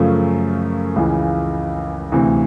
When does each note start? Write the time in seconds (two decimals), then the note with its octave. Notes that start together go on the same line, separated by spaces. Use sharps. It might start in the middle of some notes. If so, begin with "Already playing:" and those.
Already playing: F#2 C#3 F3 A3 C#4
0.96 C#2 C#3 E3
2.12 D2 C3 E3